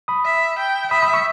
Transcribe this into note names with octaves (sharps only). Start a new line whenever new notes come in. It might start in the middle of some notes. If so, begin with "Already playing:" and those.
B5 D#6
E5
G5
E5 B5 D#6
B5 D#6
C#6 E6